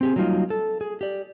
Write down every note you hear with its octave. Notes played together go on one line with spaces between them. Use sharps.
C4 G4 G#4
F#3 G3 A#3 D#4 F4
A4
G#4
G4 D5